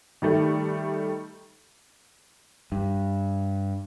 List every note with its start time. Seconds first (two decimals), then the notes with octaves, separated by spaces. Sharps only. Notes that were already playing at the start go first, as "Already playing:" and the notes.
0.22 D#3 G3 A3
2.72 G2